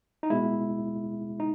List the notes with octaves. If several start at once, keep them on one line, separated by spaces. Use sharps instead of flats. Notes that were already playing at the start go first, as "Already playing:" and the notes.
D#4
B2 G#3 E4
D#4